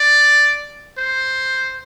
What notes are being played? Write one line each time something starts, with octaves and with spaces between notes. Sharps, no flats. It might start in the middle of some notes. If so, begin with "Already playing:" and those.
Already playing: D5
C5